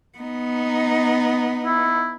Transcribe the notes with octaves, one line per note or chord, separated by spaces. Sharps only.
B3 D#4
E4